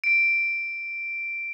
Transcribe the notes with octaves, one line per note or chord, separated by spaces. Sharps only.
D7